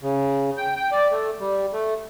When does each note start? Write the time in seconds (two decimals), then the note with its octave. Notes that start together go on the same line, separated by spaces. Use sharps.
0.02 C#3
0.57 G5
0.76 G5
0.92 D5
1.11 A3
1.40 G3
1.73 A3